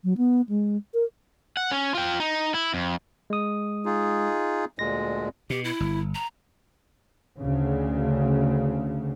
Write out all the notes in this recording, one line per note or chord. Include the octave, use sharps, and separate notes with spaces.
F#3
B3
G#3
A#4
F#5
C#4
F4 G5
D#4
E4
F2
G#3 D#6
D#4 F4 G#4
D2 A#2 G#3 A#6
B2 G4
E4
G1
A#5
D2 C#3